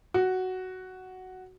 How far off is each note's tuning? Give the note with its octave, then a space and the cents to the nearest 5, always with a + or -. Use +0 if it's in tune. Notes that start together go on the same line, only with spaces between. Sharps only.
F#4 +5